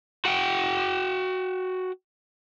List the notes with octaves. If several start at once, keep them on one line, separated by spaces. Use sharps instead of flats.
F#4 F#5 G5